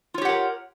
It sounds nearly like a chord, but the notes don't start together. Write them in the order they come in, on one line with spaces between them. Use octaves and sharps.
F4 C#5 G4 F#5 A#4